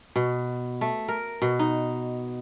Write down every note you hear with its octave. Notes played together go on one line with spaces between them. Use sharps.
B2
A3
A#4
B2
D#4